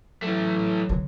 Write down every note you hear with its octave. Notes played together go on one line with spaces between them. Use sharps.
E3 F#3 A3
D3 D#3